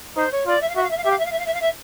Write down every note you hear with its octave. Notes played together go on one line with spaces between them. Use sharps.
D#4 C5
C#5
F4 D5
E5
F5
F#4 E5
F5
E5
F5
G4 E5
F5
E5
F5
E5
F5
E5
F5
E5